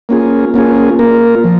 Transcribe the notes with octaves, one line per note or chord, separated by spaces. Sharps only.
A#3 C#4 F4 G#4
A#3 C#4 F4 G#4
A#3 F4 A#4
F3